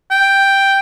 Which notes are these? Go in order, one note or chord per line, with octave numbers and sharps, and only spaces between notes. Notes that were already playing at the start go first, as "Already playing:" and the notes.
G5